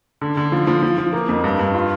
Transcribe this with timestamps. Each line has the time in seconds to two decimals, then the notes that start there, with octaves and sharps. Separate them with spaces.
0.21 D3
0.37 D3
0.52 F3
0.67 F3
0.83 F3
0.98 F3
1.13 A#3
1.29 F2
1.44 G2
1.59 G2
1.74 F4